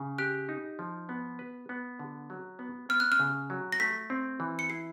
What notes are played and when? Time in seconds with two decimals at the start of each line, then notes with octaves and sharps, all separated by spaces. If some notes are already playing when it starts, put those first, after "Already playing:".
Already playing: C#3
0.18 G4 F#6
0.49 D#4
0.79 F3
1.09 B3
1.39 B4
1.69 B3
1.99 D3
2.30 F#3
2.59 B3
2.89 B3 F6
3.00 F#6
3.12 F6
3.20 C#3
3.50 F#3
3.72 A#6
3.80 A3 B6
4.10 C4
4.40 E3
4.59 C#7
4.70 E4 C7